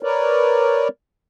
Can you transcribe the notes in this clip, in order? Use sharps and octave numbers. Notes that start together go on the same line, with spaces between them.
A#4 B4 C#5 D5